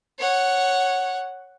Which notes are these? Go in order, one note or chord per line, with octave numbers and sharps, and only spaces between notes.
C#5 F#5